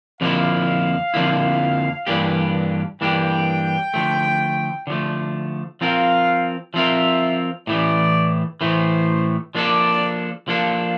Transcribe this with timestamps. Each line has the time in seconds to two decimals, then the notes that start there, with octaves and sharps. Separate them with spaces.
0.20 F2 D3 F3 A#3 E4 F5
1.14 F2 D3 F3 A#3 E4
2.07 G2 E3 A#3 D4 G4
3.00 G2 E3 A#3 D4 G4 G5
3.94 D3 F3 A3
4.87 D3 F3 A3
5.81 F3 C4 F4 A#4 F5
6.74 F3 C4 F4 A#4 E5
7.67 A2 E3 A3 D5
8.61 A2 E3 A3 C5
9.55 F3 A#3 D4 A4 D5
10.48 F3 A#3 D4 A4 F5